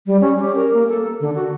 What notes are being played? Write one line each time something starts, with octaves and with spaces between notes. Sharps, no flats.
G3
C#4
G4
A#4
A#3
A4
D3
F#4